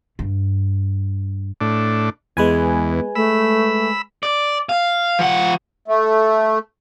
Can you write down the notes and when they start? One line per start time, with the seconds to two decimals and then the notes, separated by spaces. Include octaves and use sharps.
0.19 G2
1.61 A2 D4
2.37 E2 G#3 B3 B4 G#5
3.16 A3 B5 E6
4.23 D5
4.69 F5
5.19 F3 F#5
5.88 A3